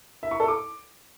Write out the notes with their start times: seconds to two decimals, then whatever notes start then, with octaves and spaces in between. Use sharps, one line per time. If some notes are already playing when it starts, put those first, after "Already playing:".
0.23 E5
0.31 C#6
0.40 A4
0.48 D6